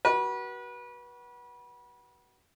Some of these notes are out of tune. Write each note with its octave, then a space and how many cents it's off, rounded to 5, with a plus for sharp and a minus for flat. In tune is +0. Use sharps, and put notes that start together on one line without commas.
F#4 +30 B4 -30